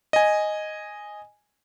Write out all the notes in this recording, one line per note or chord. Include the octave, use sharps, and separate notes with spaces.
D#5 G#5